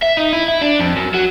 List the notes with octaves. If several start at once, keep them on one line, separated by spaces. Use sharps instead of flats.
E5
D#4
E4
E4
D4
F2
F#2
F#3